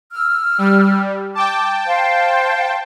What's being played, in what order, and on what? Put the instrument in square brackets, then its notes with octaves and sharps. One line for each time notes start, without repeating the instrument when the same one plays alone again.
[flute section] E6 F6
[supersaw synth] G3
[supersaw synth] G5 A5 [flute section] D6
[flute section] C5 F5